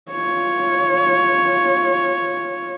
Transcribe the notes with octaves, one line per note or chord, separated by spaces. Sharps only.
F4 C#5